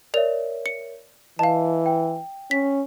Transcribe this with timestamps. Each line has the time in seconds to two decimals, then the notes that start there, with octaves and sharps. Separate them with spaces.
0.14 A#4 C#5 D5 E5 F7
0.66 C#7
1.39 E3 D#5 F5 A5
1.86 G5
2.51 C#4 B6